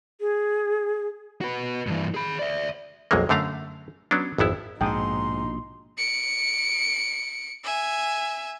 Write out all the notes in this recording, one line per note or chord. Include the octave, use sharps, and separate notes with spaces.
G#4
F#4 B4
G2 E3
G#4 B5
D5 E5
B1 F2 F#3 G#3 A#3
F#2 D3 A3 F5 A#5
F#3 B3 C#4 D4
G#1 F2 B3 E4
A#1 G#2 B2 D#4 G5 A5 C6 D#6
C#7 D7
E5 G#5